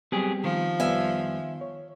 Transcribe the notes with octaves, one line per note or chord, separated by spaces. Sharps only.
F#3 G3 B3 C4 G4 G#4
D#3 F3
F2 G3 B3 E5 G#5
C#5